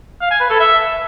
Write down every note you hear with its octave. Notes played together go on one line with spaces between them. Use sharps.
F5
G#5
B4
A4
E5